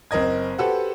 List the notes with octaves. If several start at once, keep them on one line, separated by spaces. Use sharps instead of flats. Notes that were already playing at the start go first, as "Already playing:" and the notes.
F#1 C4 A#4 D#5 G#6
F#4 G4 A4 B4 C5 F#5